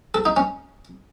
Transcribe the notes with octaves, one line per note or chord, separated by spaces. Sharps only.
A4
D#4
C#4